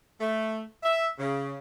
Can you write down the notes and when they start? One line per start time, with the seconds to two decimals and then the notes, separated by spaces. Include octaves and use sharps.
0.21 A3
0.83 E5
1.19 C#3